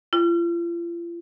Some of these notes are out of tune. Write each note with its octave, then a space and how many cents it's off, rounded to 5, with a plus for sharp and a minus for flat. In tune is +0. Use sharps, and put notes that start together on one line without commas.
F4 -40